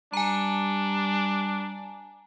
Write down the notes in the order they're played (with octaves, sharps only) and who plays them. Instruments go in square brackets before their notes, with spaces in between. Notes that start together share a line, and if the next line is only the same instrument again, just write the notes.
[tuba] G3 [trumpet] D4 [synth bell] G#5 A#5